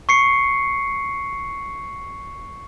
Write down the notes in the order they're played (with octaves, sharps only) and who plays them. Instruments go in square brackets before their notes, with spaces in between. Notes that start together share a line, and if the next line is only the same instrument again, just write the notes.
[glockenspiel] C#6 C7 C#7